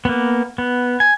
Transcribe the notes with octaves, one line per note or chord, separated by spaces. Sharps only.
A#3 B3
B3
G#5